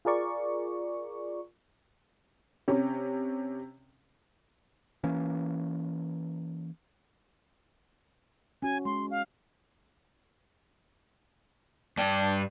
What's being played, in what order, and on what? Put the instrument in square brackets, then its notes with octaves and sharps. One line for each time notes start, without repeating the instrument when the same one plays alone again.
[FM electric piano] F4 G#4 A#4 D5 C#6
[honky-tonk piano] C3 C#4
[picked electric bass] E3 A#3 C#4
[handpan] C#4 F#4 [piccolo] G#5
[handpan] G#3 [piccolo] C6
[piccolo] F5
[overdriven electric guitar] G2 G5 [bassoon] D4